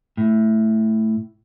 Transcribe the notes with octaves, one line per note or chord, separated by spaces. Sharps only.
A2